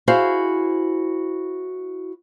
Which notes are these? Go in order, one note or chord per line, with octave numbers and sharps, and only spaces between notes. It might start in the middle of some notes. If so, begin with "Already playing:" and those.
E4 F#4 G#4 C5 F5